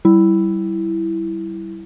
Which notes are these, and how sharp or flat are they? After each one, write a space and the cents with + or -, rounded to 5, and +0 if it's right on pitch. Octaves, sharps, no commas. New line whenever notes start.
G3 -25 E4 +0